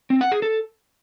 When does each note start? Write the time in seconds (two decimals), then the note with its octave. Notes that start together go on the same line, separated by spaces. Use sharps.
0.10 C4
0.21 F#5
0.32 G#4
0.42 A4